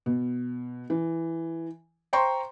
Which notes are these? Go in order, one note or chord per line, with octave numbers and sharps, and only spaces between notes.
B2
E3
C5 G5 A#5 C6 C#6